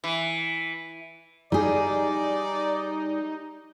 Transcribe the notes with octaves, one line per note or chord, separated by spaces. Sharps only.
E3
G3 D#4 G#4 D5